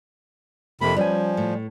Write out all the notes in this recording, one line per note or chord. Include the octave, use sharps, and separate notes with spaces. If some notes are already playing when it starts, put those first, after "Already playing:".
F2 C3 A#3 B5
F3 G3 C#4 B4 G#5
A2